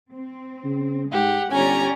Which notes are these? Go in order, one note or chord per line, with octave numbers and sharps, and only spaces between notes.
C4
C#3
G#2 G#3 G4 F#5
G1 C#4 G4 C#5 D5 G#5 A#5